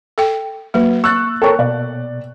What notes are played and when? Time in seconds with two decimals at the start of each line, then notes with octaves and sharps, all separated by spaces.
0.18 A4 G5
0.74 F#3 A#3 B4
1.04 C#6 E6 F#6 A6
1.42 A4 A#4 C#5 G5 C#6
1.59 B2 D5